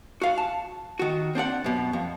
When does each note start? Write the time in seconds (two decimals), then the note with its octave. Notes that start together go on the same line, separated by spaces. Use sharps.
0.22 F#4 F5
0.38 A5
0.99 D#3 F#4
1.35 C4 D4 D5 F#5
1.64 F#2 B2
1.93 F2